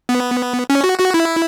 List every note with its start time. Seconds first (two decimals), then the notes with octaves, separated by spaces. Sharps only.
0.09 B3
0.70 C#4
0.84 F#4
0.99 F#4
1.14 E4